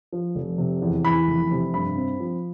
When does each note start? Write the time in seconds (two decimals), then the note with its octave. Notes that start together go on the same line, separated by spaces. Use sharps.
0.12 F3
0.35 F1
0.58 C3
0.82 E2
1.05 E3 B5
1.28 F1
1.51 C3
1.74 G2 B5
1.97 C4
2.20 F3